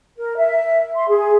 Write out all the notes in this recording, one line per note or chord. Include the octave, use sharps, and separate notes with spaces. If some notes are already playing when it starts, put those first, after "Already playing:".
A#4
E5
C6
G#4